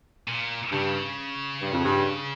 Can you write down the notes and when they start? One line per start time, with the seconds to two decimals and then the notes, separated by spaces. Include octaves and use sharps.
0.28 A#2
0.72 G2 C#3
1.62 G2
1.73 F2
1.84 G2